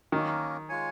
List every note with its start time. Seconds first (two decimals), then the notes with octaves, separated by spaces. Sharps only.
0.12 D#3 A#3 C#4 A#4
0.69 G#3 F4 C#5 G#5